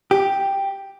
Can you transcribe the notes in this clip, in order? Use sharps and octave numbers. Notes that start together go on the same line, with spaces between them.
G4